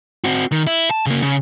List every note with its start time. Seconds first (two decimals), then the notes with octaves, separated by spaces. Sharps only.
0.24 C4 F#4
0.52 D#3
0.67 E4
0.91 A5
1.06 C#3 A#3
1.22 C#3